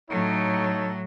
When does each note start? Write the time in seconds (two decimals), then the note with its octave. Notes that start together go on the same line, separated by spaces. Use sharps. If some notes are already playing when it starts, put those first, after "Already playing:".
0.10 A2 F#3 D#4 A4 C#5